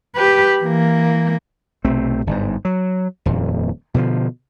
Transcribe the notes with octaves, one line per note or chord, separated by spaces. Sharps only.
G4 B4
E3 A#3
B1 C3 A3 C4
G1 G#2
F#3
D#1 F2 A#2
B2 D3 E3 F3